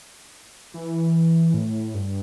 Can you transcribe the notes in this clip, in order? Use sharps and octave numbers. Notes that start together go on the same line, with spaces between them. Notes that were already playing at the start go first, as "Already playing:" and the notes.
E3
A2
G2